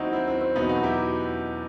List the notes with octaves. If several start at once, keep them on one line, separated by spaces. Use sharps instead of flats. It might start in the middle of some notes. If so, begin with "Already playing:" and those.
Already playing: D#2 D#3 F#3 C4 D#4 E4 F#4
C4 E4
C4
C4
E2 B2 F#3 B3 D#4
D#4 F#4
E4 G4